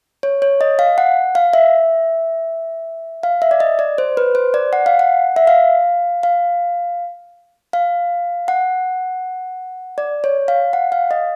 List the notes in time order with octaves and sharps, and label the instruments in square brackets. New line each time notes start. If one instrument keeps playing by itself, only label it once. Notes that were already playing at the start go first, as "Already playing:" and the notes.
[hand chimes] C#5
C#5
D#5
F5
F#5
F5
E5
F5
E5
D5
D#5
D5
C5
B4
C5
D5
F#5
F5
F#5
E5
F5
F5
F5
F#5
D5
C#5
F5
F#5
F5
D#5